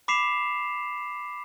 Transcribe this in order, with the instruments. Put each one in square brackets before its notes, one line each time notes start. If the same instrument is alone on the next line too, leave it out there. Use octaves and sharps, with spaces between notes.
[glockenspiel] B5 D6 B6 C7 E7 F7